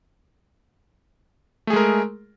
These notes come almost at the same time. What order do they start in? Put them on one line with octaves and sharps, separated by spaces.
A3 G#4 G#3 A#4